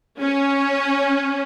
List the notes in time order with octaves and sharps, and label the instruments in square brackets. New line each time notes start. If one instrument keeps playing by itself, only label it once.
[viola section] C#4